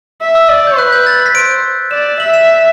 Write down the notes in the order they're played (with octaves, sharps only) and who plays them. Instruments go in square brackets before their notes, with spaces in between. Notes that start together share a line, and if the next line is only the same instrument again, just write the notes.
[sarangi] E5
[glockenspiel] E6
[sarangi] D5
[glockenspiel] G6
[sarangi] B4 [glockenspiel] F#6
[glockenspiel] G6
A6
A6
B6
[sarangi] C5 [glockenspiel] D7
[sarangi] D5 [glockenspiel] E7
[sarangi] E5 [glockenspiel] F#7
[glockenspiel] E7